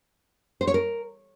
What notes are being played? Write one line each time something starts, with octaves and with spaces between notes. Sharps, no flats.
C5
C#5
A#4